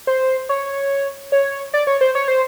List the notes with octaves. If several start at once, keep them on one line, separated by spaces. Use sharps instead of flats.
C5
C#5
C#5
D5
C#5
C5
C#5
C5